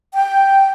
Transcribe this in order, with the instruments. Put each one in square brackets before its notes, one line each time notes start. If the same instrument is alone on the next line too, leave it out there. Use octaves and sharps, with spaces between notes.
[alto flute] G5